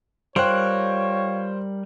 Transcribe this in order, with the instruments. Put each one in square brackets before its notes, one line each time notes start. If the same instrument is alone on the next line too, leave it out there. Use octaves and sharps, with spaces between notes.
[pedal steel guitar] G3 A#4 F#6 [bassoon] F4 [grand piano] C5 G5 [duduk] C#5